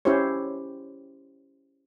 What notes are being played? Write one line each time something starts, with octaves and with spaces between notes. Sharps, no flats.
C#4 E4 G4 C5 C#5